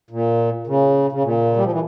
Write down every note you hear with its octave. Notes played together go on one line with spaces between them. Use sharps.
A#2
C#3
C#3
A#2
G3
F3
E3